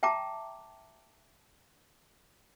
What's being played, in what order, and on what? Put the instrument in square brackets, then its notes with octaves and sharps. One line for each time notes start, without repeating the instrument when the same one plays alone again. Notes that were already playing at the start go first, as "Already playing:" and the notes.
[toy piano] E5 G5 A5 A#5 D6